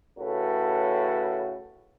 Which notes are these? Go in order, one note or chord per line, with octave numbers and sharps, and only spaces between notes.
A2 C#3 F#4 A4 B4